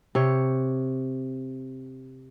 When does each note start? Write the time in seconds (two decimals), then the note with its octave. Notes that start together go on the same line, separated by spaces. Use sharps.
0.15 C3 C#5